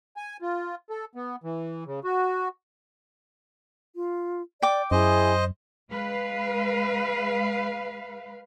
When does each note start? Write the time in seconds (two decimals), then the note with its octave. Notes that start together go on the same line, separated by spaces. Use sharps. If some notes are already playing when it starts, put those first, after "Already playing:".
0.17 G#5
0.42 F4
0.90 A4
1.15 B3
1.44 E3
1.87 C#3
2.04 F#4
3.94 F4
4.62 D5 G5 D6
4.91 F#2 E4 G#4 C5 D#5 G#5
5.91 G#3 B4 F5